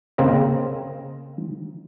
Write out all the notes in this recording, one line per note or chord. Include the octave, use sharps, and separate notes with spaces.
C#3 A#3 C4 A#4 D#5